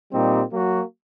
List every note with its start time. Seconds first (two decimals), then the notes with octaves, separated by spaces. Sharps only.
0.11 A#2 G3 C4 D#4 G4
0.50 F#3 A#3 F#4